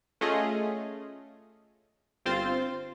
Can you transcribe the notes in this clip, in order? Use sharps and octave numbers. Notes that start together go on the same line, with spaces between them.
A3 C#4 F4 G#4 D#5
G1 C4 F4 C5 C6 A6